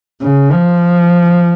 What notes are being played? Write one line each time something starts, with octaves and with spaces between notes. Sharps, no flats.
C#3
F3